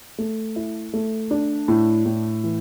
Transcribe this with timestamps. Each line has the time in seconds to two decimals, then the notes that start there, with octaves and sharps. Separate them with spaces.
0.18 A3
0.56 E4
0.93 A3
1.31 D4
1.68 A2
2.06 A2
2.44 E3